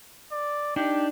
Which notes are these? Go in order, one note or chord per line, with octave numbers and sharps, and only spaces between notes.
D5
D4 D#4 G4